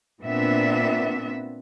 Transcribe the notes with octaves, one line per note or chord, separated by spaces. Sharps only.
A#2 B3 C4 D4 E5